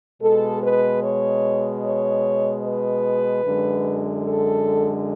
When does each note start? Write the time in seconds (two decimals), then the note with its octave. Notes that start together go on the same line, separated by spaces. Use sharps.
0.21 B2 G#3 A4
0.62 B4
1.02 C#5
1.82 C#5
2.63 B4
3.43 F#2 D3 G#3
4.24 A4